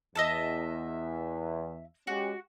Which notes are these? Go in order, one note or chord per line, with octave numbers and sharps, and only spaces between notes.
E2 D#5 E5 A5
G#3 C#4 F#4 G4